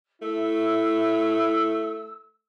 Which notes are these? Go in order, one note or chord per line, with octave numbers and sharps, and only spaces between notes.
A3 E4 E6